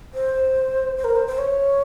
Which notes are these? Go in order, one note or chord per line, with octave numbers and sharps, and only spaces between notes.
C5
C5
A#4
C5
C5
C#5